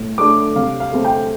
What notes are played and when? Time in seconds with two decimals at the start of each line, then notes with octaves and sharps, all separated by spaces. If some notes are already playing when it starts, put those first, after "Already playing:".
Already playing: A2
0.18 A3 D4 D6
0.56 C3 F5
0.80 F5
0.92 A3 C4
1.04 G5